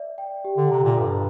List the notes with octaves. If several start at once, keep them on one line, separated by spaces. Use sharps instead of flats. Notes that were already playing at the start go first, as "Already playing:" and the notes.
Already playing: D5 E5
G5
G4
D3
C3 A#5
A#2
G2 A4